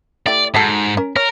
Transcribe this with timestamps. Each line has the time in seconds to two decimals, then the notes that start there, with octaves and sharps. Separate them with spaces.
0.26 A3 E4 G4 D5
0.54 G#2 D#4 F#4 A4
0.97 C#4 A#4
1.16 A#4 C#5